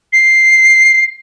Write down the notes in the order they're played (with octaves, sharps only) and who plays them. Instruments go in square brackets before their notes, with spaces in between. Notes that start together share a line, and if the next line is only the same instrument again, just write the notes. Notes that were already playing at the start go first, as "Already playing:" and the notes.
[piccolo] C7